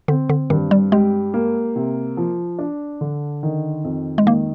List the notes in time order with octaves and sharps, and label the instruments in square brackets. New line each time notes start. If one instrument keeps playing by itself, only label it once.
[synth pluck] D3 [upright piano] C4
[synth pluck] D3
[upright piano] G2 [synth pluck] D#3
[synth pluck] G3
[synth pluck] G#3 [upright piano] G4
[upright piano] A#3
C3
F3
D4
D3
D#3
F2
[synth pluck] G#3
[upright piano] D#3 [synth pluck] A#3